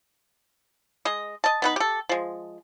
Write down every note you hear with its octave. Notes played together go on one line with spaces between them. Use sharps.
G#3 D#5
D#5 A5
B3 D#4 B4
G4 A4
F3 G#3